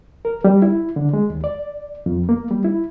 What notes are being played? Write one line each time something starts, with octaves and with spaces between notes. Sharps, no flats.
A#4
G3
E4
D3
G#3
D#2
D5
F2
A#3
G3
E4